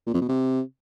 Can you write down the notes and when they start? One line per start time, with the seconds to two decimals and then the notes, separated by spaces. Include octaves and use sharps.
0.07 A#2
0.14 F2
0.21 B2
0.28 C3